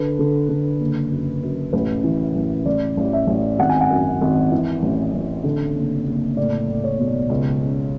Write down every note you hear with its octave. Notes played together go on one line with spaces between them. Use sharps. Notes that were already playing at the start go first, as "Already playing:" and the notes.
Already playing: D3 B4
D3
D3
F#1
F#2
F#2
A1 B4
E3
A1
A1 D5
A1
E5
A1
G#1 F#5
G#5
F#5
F#2
G#1
E3
A1
A1
D3
F#1
F#1
A2 D5
A2
C#5
B1
C#2
C#3